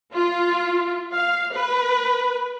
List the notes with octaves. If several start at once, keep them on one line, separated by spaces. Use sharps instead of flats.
F4
F5
B4